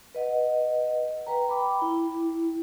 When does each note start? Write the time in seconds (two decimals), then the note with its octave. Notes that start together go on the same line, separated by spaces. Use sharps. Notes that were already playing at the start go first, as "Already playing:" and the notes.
0.15 B4 D#5 F#5
1.27 B4 G5 A#5
1.47 G5 B5 D6
1.82 E4